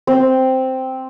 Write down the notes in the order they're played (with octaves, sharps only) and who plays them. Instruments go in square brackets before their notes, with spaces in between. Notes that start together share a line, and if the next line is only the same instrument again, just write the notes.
[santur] C4